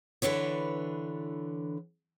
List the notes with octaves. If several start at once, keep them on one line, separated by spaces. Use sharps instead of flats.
D3 E3 D4 B4 C#5